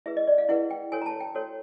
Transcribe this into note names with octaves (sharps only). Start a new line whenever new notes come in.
E4 G#4 B4 E5
D#5
D5
F5
E4 G#4 B4 F#5
G5
F#4 A4 C#5 G#5
A#5
A5
G5
F#4 A4 C#5